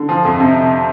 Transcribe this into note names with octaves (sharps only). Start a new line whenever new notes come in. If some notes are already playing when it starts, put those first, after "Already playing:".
Already playing: D3
F3
F2
C3